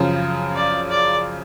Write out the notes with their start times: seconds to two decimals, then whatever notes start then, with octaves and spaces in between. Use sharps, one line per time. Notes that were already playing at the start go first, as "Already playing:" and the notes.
Already playing: F#2 C#3 F3
0.55 D5
0.90 D5